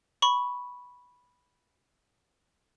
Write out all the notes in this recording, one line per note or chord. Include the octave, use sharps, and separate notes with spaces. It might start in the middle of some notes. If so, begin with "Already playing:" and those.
B5 C#6